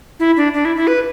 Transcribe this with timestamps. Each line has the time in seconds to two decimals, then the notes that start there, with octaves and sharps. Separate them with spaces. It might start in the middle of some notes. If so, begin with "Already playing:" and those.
0.20 E4
0.37 D4
0.54 D4
0.65 E4
0.76 E4
0.87 B4